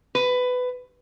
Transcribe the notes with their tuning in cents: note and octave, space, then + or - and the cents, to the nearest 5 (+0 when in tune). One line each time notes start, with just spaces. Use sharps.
B4 +15